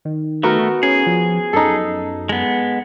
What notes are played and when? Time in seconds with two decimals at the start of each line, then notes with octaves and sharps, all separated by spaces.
0.05 D#3
0.43 A3 B3 F#4 A#4
0.83 C#4 G#4
1.07 F3
1.53 F#2 D#4 A4
2.29 G#3 B3